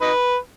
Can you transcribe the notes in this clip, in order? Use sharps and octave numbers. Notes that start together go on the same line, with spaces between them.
D#4 B4